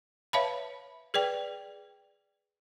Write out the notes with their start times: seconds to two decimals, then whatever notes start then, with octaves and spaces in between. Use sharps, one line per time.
0.33 B4 C#5 E5 F5 A5 B5
1.14 G#4 B4 D5 G5